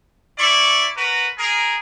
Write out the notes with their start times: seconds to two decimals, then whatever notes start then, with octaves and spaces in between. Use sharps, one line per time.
0.39 E4 D5 C#6
0.96 F#4 A#4 B4
1.38 G#4 A#4